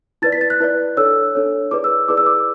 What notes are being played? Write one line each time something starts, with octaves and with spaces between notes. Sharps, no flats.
E4 B4 D5 A6
B6
A6
F#6
E4 B4 D5
D4 A4 C#5 E6
D4 A4 C#5
E4 G#4 B4 D5 D6
E6
E4 G#4 B4 D5 D6
E6
D6